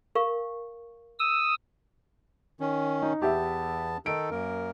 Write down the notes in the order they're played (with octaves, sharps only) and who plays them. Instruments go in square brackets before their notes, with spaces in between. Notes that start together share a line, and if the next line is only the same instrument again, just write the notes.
[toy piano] A#4 F5 C#6
[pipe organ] D#6 E6
[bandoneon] D#3 C#4
[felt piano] D#4
[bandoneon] E2 B3 A5 [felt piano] G4 E5
[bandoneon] D#3 D#4 A4 [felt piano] D7
[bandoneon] F#2 A#3 A#4